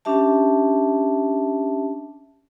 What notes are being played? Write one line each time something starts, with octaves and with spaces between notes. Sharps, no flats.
C#4 D4 G4 E5 A5